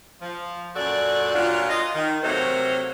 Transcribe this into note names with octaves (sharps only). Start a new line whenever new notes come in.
F3
F#2 A#2 F#4 A4 D5
A#2 F#3 D4 F4
F4 D#5
D#3
C3 F#3 A3 A#3 A#4 C5